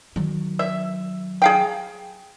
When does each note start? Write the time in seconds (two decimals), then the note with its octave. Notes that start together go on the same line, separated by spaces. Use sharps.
0.16 D#3 F#3
0.59 E5
1.42 G#4 F5 G5